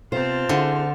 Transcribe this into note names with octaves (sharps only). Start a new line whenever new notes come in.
C3 B3 C4 F4 C5 A5 F6
D3 E4 G4 G#4